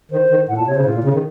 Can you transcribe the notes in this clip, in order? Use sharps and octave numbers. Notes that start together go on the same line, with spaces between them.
D#3 C5
D#3
A2 F#5
A#2 A5
C3 C#5
C#3 C5
A2 F4
A#2
C#3
D#3